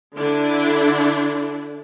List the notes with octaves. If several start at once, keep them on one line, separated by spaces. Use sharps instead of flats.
D3 D4 E4